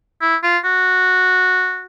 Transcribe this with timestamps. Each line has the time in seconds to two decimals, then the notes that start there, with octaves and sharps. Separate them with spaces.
0.21 E4
0.43 F4
0.64 F#4